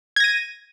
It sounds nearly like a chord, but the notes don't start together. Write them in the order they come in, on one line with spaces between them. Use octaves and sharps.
G#6 A#6 D#7